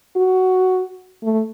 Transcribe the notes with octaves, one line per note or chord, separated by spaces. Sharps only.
F#4
A3